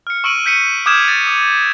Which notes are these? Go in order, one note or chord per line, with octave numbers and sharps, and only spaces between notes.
F6 C#7
C#6 E6 D7 D#7 F#7
G6 B6 C#7 D#7
D6 D#6 F6 G6 G#6 E7
A6
D#6